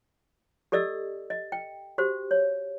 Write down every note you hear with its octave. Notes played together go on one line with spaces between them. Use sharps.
G4 A4 D5 D#5 E6
D#5
G5
F#4 G4 C5
C#5